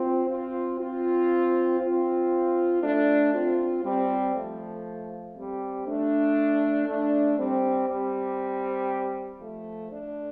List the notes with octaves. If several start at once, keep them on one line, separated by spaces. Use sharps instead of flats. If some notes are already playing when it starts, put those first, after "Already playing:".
Already playing: C4 F4
C4 F4
C4 F4
C4 F4
A3 D4
C4 F4
G3 C4
F3 A3
G3 C4
A3 D4
A3 D4
G3 C4
G3 C4
F3 A3
A3 D4